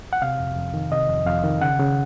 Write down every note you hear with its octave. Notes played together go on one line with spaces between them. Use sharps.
F#5
C3 F5
F2
F2
D#3
C3 D#5
F2
F2 F5
D#3
C#3 F#5
C#3